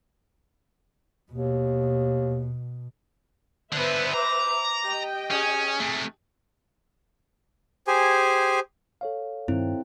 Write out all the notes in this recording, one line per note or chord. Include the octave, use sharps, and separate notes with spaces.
D#2 B2
D3 B3 B4 C5 E5
A#5 D6
G4 D#5 G5
C#4 G#4
C3 A3
G4 G#4 C5 G#5
A4 C#5 F5
G2 D#3 C4 E4